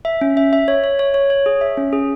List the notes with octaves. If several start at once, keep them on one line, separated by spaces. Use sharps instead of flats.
E5
C#4
E5
E5
C#5
C#5
C#5
C#5
C#5
G#4
E5
C#4
G#4